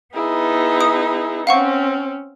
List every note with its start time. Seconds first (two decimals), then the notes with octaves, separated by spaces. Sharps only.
0.15 B3 D#4 E4 G#4
0.81 D#6
1.47 C4 C#4 F5 F#5 C#6